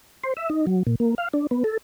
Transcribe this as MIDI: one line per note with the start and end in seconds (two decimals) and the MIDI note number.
0.24 0.34 72
0.37 0.49 76
0.50 0.66 63
0.67 0.83 54
0.87 0.95 46
1.00 1.15 58
1.18 1.28 77
1.33 1.47 62
1.51 1.63 59
1.64 1.77 69